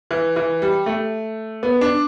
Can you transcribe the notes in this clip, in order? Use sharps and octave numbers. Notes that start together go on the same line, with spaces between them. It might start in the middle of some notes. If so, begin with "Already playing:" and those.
E3
E3
G3
A3
B3
D4